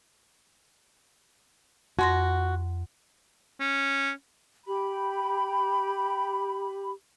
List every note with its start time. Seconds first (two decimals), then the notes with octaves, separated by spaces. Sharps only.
1.99 F2 F#4 C6 A#6
3.60 C#4
4.66 G4 B5